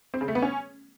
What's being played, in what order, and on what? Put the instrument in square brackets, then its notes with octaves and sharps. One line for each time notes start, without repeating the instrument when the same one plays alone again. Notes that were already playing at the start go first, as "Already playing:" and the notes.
[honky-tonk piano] C4
C#3
A3
B3
C#4